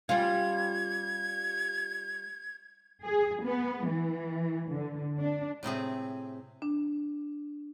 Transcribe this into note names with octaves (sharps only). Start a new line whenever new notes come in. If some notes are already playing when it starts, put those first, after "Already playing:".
G3 C#4 F4 G#6
G#4
B3
E3
D3
D4
A2 C3 C4 G#4
D4